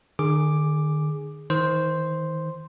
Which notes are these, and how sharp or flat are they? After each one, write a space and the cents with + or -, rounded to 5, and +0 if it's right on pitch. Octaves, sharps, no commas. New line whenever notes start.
D#3 -45 G#4 +0 D6 +5
D#3 +40 C5 +0